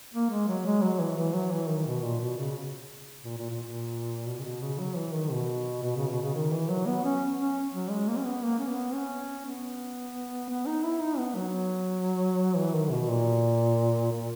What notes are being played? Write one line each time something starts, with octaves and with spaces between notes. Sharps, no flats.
A#3
G#3
F#3
G#3
F#3
E3
E3
F#3
E3
D#3
B2
A#2
B2
C#3
A#2
A#2
A#2
A#2
B2
C#3
B2
C#3
F#3
E3
D#3
B2
B2
C#3
B2
C#3
D#3
E3
F#3
B3
C#4
C#4
F#3
G#3
A#3
C#4
B3
A#3
C#4
B3
C#4
B3
B3
D#4
E4
D#4
B3
F#3
E3
D#3
B2
A#2
A#2